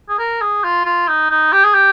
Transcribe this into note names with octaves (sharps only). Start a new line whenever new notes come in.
G#4
A#4
G#4
F4
F4
D#4
D#4
G4
G#4
G4